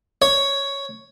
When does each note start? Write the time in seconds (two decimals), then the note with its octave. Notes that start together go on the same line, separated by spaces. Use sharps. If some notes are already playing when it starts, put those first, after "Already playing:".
0.22 C#5